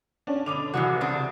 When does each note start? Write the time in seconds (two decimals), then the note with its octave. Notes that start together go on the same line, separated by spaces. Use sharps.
0.27 C#4 D4
0.46 B2 D3 D6 F7
0.74 C2 E3 G#3 F#4
1.01 C#3 C4 D4